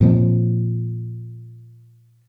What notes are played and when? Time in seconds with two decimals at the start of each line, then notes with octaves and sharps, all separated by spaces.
0.01 A#2 F3 C4